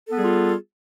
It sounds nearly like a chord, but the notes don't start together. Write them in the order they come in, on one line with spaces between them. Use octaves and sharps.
A4 B3 G#4 G3 F4